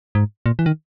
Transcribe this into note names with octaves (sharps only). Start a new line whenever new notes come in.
G#2
A#2
E3
D#3